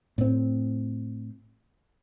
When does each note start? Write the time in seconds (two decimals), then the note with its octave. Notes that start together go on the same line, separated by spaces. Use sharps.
0.18 A2 C4